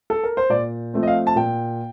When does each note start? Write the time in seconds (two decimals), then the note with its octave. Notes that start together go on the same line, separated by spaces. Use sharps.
0.10 A4
0.24 A#4
0.37 C5
0.50 A#2 D5
0.94 F3 A3 C4
1.03 D#5
1.07 F5
1.27 A5
1.36 A#2 G5